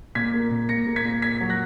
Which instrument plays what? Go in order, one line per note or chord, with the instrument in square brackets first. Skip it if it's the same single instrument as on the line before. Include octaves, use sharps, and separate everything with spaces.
[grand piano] A#2 G#6 B6
A#3
A#2
A#2 A#6 C#7
A#3
G#6 B6
A#2
A#2 G#6 B6
F#3
F#6 A#6